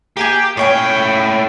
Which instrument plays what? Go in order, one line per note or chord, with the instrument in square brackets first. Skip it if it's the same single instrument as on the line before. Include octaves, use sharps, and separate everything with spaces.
[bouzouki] A#3 G#4 G#5 [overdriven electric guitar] G4
[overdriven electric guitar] A2 G5 [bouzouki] C#4 C#5 G#5